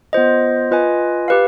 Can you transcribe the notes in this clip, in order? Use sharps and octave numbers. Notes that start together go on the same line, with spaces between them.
B3 F4 C5 D#5
F4 B4 D#5 G#5
G4 B4 F5